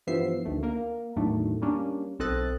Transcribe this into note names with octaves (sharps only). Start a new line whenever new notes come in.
G2 E3 F3 B3 E5 C7
D2 D#3 A3
A#3 A#4
E2 A2 D#3 F#3 A3 D4
G3 A#3 C#4 D4
B1 C4 A4 D#5 F#6 A6